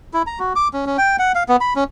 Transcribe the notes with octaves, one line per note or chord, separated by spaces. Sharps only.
E4
A#5
F#4
D6
C#4
C#4
G5
F#5
F5
B3
B5
C#4